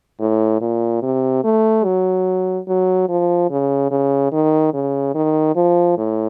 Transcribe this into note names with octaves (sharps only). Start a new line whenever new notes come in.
A2
A#2
C3
A3
F#3
F#3
F3
C#3
C#3
D#3
C#3
D#3
F3
A2